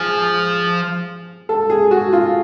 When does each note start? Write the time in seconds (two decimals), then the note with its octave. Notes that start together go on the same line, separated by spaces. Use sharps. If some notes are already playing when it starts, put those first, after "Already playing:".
Already playing: F3 G#4
1.49 A4
1.70 G#4
1.91 F#4
2.13 F4